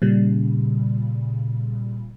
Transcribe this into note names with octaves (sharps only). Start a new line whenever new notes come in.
A#2 C#3 G3